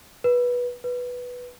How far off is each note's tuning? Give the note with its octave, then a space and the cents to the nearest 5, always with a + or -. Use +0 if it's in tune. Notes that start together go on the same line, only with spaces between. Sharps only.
B4 -15
B4 -5